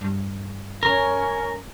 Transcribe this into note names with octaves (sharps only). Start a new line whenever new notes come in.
G2
C#4 A#4